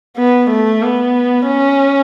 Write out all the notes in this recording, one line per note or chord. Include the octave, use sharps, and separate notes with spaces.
B3
A3
B3
C#4